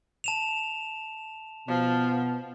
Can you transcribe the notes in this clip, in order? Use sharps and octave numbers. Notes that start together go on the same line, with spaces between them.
A5 E7 F7
B2 F3 B3